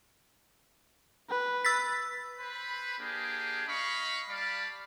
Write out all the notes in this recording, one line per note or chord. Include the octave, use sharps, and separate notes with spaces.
B4
E6 A6 B6
B4 C5 B5
A#3 D4 G4 G#4
D#5 F5 B5 C#6
G3 D5 F5 A5 B5